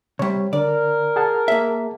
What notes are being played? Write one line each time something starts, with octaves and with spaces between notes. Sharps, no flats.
C3 G3 C#5
D3 A#4 D5
G#4 F#5 A5
A#3 E5